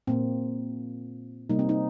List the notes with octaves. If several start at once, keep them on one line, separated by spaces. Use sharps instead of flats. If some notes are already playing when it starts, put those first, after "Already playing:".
A#2 A#3 C4
C3 G3 A#3 D#4
C4
D#4